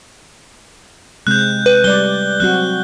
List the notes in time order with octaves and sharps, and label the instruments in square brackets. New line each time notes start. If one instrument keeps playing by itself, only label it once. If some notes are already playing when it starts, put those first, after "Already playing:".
[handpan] C3 G#3 C4 [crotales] F#6 G6
[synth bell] B4
[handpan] G3 D5 [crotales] G7
[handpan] F#3 C4 F#4 [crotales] F#6